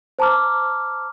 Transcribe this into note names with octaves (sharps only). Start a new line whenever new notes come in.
C5 A5 A#5 D6 F6